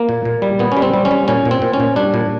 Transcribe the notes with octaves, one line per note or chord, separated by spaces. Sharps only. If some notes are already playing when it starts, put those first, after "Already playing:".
Already playing: A#3
A#2
A#2
G3
A#2 B3
C#4
G3
C4
G3
C#4
G3
A#2 C#4
A#2
C4
A#2
C#4
A#2
G3 D4
A#2